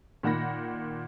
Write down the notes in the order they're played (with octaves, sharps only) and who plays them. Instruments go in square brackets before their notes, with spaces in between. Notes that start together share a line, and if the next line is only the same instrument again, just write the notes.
[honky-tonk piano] A#2 D#3 F#5 B5 A#6